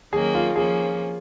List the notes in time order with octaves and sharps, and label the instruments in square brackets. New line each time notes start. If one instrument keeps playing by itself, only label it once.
[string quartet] D#3 F#3 A#3 C#4 [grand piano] G#4
[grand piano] F4
[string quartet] F3 A#3 C#4 [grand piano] G#4